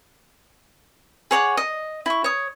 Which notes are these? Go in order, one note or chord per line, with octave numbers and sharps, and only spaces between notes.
G#4 C#5 F#5 D6
D#5
E4 C#6
C#5 D#6